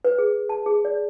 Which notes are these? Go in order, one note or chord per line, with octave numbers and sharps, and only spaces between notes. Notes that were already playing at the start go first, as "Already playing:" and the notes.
B4
G#4
A5
G#4
D5